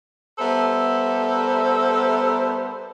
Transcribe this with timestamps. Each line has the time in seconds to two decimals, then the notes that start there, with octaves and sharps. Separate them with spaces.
0.39 G3 B3 A4 A#4 C5 E5